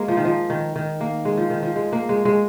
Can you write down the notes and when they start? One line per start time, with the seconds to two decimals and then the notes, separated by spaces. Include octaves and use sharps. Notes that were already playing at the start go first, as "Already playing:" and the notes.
Already playing: G#3 A#3
0.08 F3
0.17 D#3
0.25 F3
0.50 D#3
0.76 D#3
1.01 A#3
1.25 G#3
1.38 F3
1.50 D#3
1.63 F3
1.76 G#3
1.93 A#3
2.09 G#3
2.25 G#3